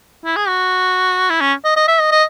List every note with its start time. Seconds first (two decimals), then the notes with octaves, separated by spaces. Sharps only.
0.25 E4
0.36 G#4
0.48 F#4
1.30 E4
1.41 C#4
1.65 D#5
1.76 D#5
1.88 E5
2.00 D#5
2.12 D#5